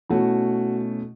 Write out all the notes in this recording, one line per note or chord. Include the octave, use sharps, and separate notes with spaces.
B2 A3 C#4 E4 F#4